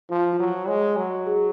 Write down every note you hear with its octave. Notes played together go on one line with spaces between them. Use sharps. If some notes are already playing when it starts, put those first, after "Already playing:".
F3 F4
F4
F#3 F#4
G#3 C#5
F#3
G#4